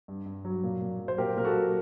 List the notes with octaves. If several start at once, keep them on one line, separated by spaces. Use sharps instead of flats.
G2
G2
F#3
A#2
A#2
F#3
C5
A#2 G4 A#4
A#2 A#4
F#4 A4
F#3